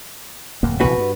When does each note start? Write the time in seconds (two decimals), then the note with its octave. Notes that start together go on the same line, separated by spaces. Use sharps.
0.63 D1 F2 A#3
0.80 A#1 C3 E3 F#4 B4
0.98 G2